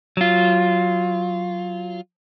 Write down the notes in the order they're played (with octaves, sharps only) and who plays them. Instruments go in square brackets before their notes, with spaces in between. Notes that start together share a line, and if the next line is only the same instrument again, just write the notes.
[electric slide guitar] F#3 F4